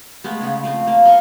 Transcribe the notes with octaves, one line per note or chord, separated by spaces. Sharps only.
G#3 A3 B3
C#3 B3
F3 A3 C4
A#3
D#5 F5 C6 C#6